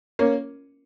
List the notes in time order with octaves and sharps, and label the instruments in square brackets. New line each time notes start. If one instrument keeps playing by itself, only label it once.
[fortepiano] A#3 C#4